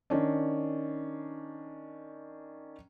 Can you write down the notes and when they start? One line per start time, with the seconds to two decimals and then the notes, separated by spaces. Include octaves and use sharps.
0.10 D#3 C#4 D4